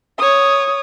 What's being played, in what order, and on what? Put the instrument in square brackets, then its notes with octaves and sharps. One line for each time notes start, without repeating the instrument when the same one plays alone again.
[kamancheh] C#5 D#6